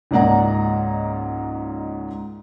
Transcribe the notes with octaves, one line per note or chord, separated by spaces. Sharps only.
C#2 G#2 A#3 D5 F#5 A#5